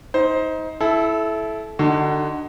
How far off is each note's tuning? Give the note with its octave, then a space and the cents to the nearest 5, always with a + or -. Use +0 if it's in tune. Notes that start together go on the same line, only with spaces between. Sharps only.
D#4 +25 C5 +0
E4 +0 A4 -25
D3 +20 D#4 +0 F#4 +30